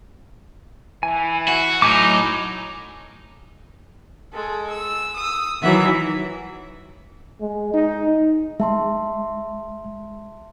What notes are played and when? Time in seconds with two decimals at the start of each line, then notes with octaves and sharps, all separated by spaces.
1.03 E3 G#5
1.48 F#4
1.82 A2 F#3 D#4 G#5 D6
4.33 G#3 A4
4.70 E6
5.17 D#6 E6
5.62 D#3 E3 F#3 E5 F#5
7.41 G#3
7.74 D#4
8.60 G#3 E5 A5 C6